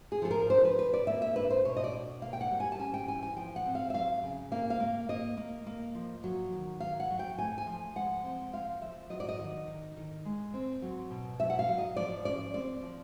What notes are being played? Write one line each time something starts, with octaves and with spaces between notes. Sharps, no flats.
G#4
F3 A4
A#4
D4 C5
B4
D4 B4
D5
A#3 E5
E5
D4 B4
C5
B2 C#5
D#5
D5
B2
A#3 F5
G5
F#5
G3
G#5
A5
C#4 G#5
G5
E3 G#5
G#5
F3 G5
F#5
C4
F5
E5
F#3 F5
C#3
A#3 F5
F5
A#3
A#3 D#5
A#3
A#3
F3
F#3
D#3
F#3 F5
F#5
F#3
G5
A3 G#5
G#5
F3
G#3 F#5
C4
F3 F5
F3 E5
F#3 D#5
D5
D#5
D#3
D#3
D#3
G#3
C4
F#3
B2
F#3 E5
F#5
F5
F#3
D#5
F3 D5
C#4 D5
C4 D5
F3